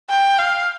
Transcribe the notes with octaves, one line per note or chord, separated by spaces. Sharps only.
G5
F5